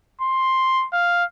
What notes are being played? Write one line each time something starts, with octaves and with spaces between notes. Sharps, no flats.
C6
F5